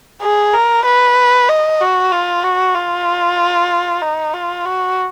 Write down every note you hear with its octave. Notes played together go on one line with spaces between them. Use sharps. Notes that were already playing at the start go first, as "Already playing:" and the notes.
G#4
A#4
B4
D#5
F#4
F4
F#4
F4
D#4
F4
F#4